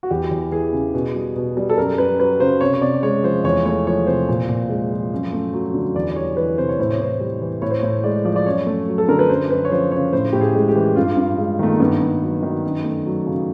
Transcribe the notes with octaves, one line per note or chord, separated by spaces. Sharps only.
F#4
E2 G4
E2
E3 G#4
C#3
B2
G3
B2
G3
A4
F#2 A#4
F#2 B4
F#3 B4
C#3 C5
C3 C#5
C#5
C3 D5
G#3 C#5
F3 C5
E2 C#5
A3 C#5
F3 C#5
C3 C5
A#2
A#2
G#3
F3
F#2
A3
F#3
D3
E2 D5
D5
G3 C#5
E3 B4
C3 C5
C#5
A2 C5
C#5
A2 C5
G3
E3
A2 C#5
C5
A2 C#5
G#3 D5
F3 D5
D5
F#2 C#5
A3
F#3
A4
D3 A#4
B4
F#2 C5
F#2 B4
C#5
F3 C5
C#3 C#5
A2 C5
A2 G4
G#4
G#3
G4
E3
G2 F4
G2
G#3
D#3 A3
A#3
G2 B3
G2
F#3
D#3
F#2
A3
F#3
C#3